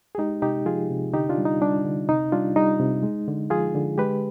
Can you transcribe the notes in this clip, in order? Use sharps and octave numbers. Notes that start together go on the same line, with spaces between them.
G#4
G#3 D#4 G4
C3 D#4 G4
F3 F4 G#4
C3
D3 D#4 G4
D4 F4
G3
D#4
G3 D4
D3
C3 D#4
G3 D4 F4
G3 D#4
C3
G#3
D3
F3 F4 G#4
D3
G#3 G4 B4